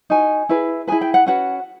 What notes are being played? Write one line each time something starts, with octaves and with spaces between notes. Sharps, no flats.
D#4 F#4 G#5
E4 G#4 B4
E4 G#4 B4 G#5
G5
F#5
C#4 F#4 B4 F#5